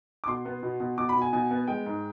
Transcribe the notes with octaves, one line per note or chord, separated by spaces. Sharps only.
D6
B2 C6
B3
B2
B2
B2 D6
B5
B2
G#5
B2 G#5
B3
G#3 G5
G#2